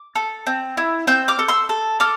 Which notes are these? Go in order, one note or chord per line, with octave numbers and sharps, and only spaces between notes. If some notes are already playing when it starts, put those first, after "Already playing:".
Already playing: D6
A4
C4
E4
C4 E6 G6
D6 F6
A4
C6 E6
A4
A4 D6 F6